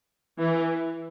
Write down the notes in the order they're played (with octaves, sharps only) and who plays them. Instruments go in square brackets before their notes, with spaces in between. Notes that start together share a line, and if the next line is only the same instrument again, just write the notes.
[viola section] E3